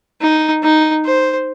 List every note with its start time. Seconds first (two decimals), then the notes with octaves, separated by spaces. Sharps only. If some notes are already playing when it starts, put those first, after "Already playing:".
0.21 D#4
0.63 D#4
1.05 C5